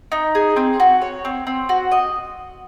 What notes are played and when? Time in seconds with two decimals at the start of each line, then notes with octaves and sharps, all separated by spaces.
0.12 D#4
0.35 G#4
0.56 C4
0.80 F#4
1.02 C#5
1.25 C4
1.47 C4
1.69 F#4
1.92 D#5